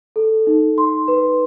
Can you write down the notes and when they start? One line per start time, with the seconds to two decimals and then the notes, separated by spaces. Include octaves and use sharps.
0.16 A4
0.47 D#4
0.78 C6
1.08 B4